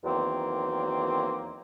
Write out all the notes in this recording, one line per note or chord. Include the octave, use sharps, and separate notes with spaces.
E2 D#3 F#3 A#3 C4